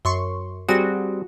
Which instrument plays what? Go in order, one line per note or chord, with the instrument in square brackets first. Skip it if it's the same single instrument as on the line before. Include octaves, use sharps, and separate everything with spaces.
[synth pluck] F#2 C6 C#6
[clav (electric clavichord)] G3 C4 G#4 [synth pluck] F#4